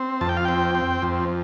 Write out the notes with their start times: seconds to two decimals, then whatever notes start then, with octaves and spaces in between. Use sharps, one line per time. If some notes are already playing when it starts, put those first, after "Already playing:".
Already playing: C4
0.21 F2 A5
0.29 G5
0.37 F5
0.45 C4 G5
0.75 C4
1.02 F2